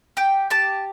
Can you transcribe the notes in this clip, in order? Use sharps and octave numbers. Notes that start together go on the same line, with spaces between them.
G4 G5
G4 A5